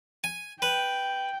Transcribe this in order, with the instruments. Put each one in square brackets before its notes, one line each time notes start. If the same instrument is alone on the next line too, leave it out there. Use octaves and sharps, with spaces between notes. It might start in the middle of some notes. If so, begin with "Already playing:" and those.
[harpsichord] G#5
[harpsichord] B4 [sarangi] G5